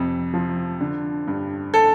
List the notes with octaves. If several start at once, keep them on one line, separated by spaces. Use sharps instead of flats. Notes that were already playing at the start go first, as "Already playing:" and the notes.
Already playing: F2 C3
F3
D3
G2
A4